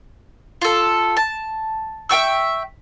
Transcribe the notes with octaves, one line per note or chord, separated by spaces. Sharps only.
F4 A4
A5
E5 G5 C#6 E6